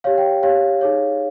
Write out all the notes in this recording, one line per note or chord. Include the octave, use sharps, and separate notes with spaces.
G4 C#5 F5
G5
G4 C#5 F5
D#4 G#4 C#5